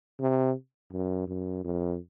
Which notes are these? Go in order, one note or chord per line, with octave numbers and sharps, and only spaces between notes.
C3
F#2
F#2
F2